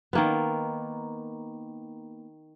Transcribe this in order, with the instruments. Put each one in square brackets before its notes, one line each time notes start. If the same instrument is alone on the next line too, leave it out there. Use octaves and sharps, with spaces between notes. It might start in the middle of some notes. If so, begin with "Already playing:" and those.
[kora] D#3 A#3 B3